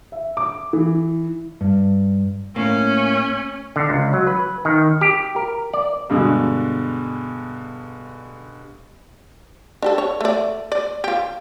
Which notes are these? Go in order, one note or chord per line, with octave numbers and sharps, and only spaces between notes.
E5
D6
E3
G2
A2 A#3 C#4
D3
C#2
F#3
B4
D#3
G4
A#4
D5
G2 B2 D3 G#3
D4 G4 A4
C#5
A3 D5
D5
F4 G4